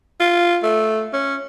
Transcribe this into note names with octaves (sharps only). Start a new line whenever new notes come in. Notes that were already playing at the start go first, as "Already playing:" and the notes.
F4
A3
C#4